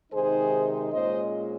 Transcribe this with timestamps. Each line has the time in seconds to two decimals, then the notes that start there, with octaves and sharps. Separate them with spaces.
0.12 C3 D#3 G#3 D#4 G#4 C5
0.93 A#2 G#3 C#4 C5 D#5